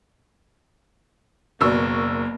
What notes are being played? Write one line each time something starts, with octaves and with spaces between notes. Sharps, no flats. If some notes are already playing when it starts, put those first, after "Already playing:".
F#1 B2 A#3 D5 C#6 E6